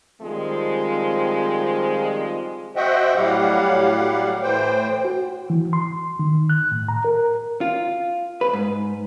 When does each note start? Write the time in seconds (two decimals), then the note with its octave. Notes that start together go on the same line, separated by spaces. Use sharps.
0.22 D#3 F3 G3 G#3 C4 F4
2.76 F#4 C5 D#5 E5 F#5 G5
3.16 A2 F#3 G3 G4 F5 F#5
4.43 A2 E3 C5 G5
5.05 F#4
5.50 E3
5.73 C6
6.19 D#3
6.49 F#6
6.72 A2
6.88 A#5
7.05 A#4
7.61 F4
8.41 B4
8.53 G#2